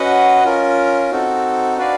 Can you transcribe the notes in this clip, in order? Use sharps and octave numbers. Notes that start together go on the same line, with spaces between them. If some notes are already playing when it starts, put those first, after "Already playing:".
Already playing: C#4 F#4 B4 D#5 F#5
C#4 F4 A#4
C4 D#4 F#4 A4
D4 F#4 B4 D5 F5